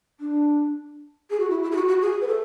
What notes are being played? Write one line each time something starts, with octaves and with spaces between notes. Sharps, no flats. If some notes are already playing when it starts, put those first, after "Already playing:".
D4
G#4
F#4
E4
E4
G#4
F#4
F#4
G#4
B4
A4